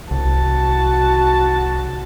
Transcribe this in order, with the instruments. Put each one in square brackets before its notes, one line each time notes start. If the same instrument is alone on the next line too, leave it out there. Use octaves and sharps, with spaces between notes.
[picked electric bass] C2 [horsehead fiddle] F#4 A5